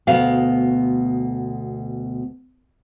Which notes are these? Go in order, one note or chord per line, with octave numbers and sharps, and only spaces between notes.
D2 B2 B3 F5